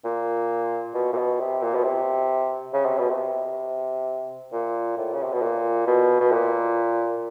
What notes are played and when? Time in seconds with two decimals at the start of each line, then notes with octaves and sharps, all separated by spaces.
0.05 A#2
0.94 B2
1.13 A#2
1.17 B2
1.40 C3
1.62 A#2
1.74 B2
1.84 C3
2.73 C#3
2.86 C3
2.99 B2
3.10 C3
4.52 A#2
4.97 A2
5.14 C#3
5.23 C3
5.33 B2
5.42 A#2
5.87 B2
6.20 B2
6.32 A#2